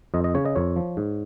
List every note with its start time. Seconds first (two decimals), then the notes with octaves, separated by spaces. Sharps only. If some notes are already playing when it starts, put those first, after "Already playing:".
0.14 F2 D#5
0.24 D#5
0.35 C#3 C#5
0.45 D#5
0.56 F2 C#5
0.76 F3
0.97 G#2